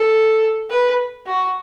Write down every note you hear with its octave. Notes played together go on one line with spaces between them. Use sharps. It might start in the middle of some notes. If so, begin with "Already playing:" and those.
Already playing: A4
B4
F#4